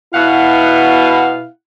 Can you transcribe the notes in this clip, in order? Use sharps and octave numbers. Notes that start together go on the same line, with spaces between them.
B2 B3 E4 F5 F#5